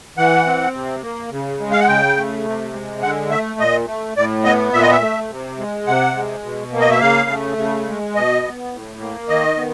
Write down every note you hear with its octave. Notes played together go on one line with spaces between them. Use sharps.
E3 F#5
C4
C3
A#3
C#3
G#3
F5
F#5
C#3 G5
A3
C3
G#3
D3 F#5
A3 E5
A#2 D#5
A3
A2 D5
B3 D#5
A#2 E5
D#5
E5
A3
C3
G#3
C3 F#5
G#3
B2
A#3
D#5
E5
C#3 F5
A3
C#3
G#3
B2 D#5
B3
A2
A#3
D#3 D#5
B3